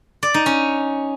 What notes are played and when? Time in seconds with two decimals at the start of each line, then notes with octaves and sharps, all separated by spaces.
0.23 D5
0.34 D#4
0.46 C#4